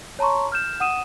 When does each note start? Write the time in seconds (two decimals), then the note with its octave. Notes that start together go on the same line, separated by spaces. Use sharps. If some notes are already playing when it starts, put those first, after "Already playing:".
0.19 C#5 A5 A#5 C6 C#6
0.52 F6 G6 E7
0.80 F#5 D#6 D#7 E7